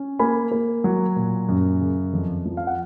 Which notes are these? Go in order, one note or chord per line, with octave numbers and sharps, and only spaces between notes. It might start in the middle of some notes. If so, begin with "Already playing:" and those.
Already playing: C#4
A#3 G#5 B5
A#3
F#3
A#2
F#2
C#3
F2
F3
F5
F#5